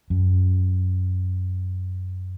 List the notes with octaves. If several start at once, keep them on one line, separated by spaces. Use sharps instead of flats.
F#2